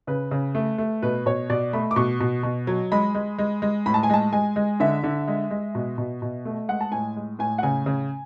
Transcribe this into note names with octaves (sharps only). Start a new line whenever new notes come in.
C#3 B4
C#3
A3
A3
B2 B4
B2 C#5
B2 D5
A3 B5
D6
B2 C#6
B2
B2
F#3
G#3 B5
G#3
G#3
G#3
A2 B5
A5
G#5
G#3 A5
G#3 G#5
G#3
D3 E5
D3
G#3
G#3
B2
B2
B2
A3
G#3 F#5
A5
A2 G#5
G#3
A2 G#5
F#5
C#3 G#5
C#3